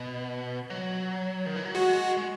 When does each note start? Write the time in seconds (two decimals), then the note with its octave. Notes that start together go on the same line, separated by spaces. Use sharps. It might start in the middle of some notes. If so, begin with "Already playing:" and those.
Already playing: B2
0.70 F#3
1.46 D#3
1.56 E3
1.65 F#3
1.75 G#3 F#4
2.17 G#3